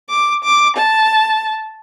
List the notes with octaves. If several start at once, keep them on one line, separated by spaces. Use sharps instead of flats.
D6
D6
A5